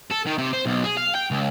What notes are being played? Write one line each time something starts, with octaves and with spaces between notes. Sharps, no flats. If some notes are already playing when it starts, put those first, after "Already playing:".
A4
D#3
C3
C5
B1
G#4
F5
G5
C#2